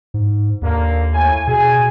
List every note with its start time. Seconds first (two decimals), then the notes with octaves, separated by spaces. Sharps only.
0.14 G#2
0.62 D#2 D3 A#3
1.12 A2 G#5
1.47 B2 G#4 G#5